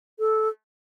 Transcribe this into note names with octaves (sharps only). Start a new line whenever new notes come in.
A4